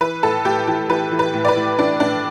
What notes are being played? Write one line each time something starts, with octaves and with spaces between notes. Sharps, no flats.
E3 B4
A2 A4
A2 G4
E3 G4
E3 B4
E3
B4
A2
D5
B4
A2
E3 D4
A2 D4